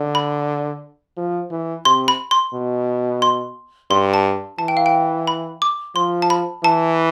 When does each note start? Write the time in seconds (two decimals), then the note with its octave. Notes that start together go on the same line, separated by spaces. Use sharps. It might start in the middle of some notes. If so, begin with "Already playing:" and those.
Already playing: D3
0.15 B5
1.17 F3
1.51 E3
1.85 C3 C6
2.08 B5
2.31 C6
2.54 B2
3.22 C6
3.91 G2 C6
4.14 A5
4.58 E3 A5
4.68 G5
4.77 F5
4.86 G5
5.27 B5
5.62 D6
5.95 F3 C6
6.22 A5
6.30 B5
6.64 E3 A5